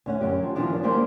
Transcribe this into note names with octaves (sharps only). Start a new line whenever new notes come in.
D2 C#4 F#5
F#2 G4
F3
B2 E3 F3 D4 D5
D#3 F#3
G3 G#3 A#3 D4 G4 C5